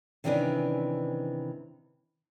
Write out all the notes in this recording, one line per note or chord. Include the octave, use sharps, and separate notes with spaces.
C3 D#3 E3 C#4 D4 B4